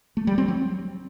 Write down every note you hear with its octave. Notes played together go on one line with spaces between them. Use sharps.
A3
G3
C4
F#3